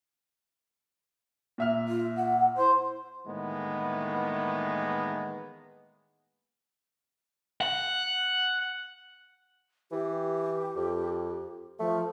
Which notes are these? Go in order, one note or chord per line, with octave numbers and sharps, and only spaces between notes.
A#2 E5 F6
F4
F#5
E4 C5
A2 D#3 E3 G#3 A#3 B3
F#5
E3 G4
F2
F3 A3